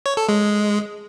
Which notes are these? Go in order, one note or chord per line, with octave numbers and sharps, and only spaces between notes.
C#5
A4
G#3